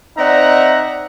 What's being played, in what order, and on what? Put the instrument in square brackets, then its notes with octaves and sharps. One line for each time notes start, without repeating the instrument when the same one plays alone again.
[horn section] C4 D#4 D5 E5 F#5 A#5